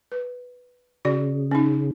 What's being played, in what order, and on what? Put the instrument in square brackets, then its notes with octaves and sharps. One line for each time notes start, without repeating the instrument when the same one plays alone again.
[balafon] B4
[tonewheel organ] C#3 [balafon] F#4 D5
[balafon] C#4 D#4